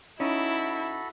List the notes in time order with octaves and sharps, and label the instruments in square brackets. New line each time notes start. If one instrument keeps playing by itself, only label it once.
[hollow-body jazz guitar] C#4 D#4 [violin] E4 [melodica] F#4 A4 B5